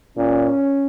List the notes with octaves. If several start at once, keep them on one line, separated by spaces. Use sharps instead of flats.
A#2 C#4